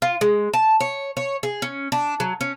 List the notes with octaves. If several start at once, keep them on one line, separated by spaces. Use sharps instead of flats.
F4
G#3
A5
C#5
C#5
G#4
C#4
D4
F#3
C#4